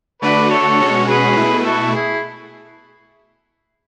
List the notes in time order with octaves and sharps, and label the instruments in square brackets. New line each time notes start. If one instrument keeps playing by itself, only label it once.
[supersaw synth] D3 A3 D4 F#4 [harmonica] B4 D5
[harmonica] A4 C#5
[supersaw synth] B2 G#3 C#4 F#4
[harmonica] G#4 B4
[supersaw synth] B2 A3 E4
[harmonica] B4
F#4 A4
E4 G#4